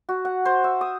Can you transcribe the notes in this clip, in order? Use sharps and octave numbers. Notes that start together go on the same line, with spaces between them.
F#4
F#5
C5
E5
D#6